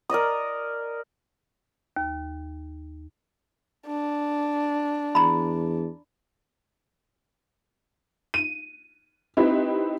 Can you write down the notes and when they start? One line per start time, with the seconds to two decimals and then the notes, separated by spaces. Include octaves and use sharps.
0.09 A#4 D5 D#5 D#6
1.97 D#2
3.87 D4
5.15 E2 A#5 B5
8.34 D#7
9.37 C4 D#4 E4 G4 B4